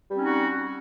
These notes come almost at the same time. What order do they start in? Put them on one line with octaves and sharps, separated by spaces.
G3 C4 C#4 D#4 F#4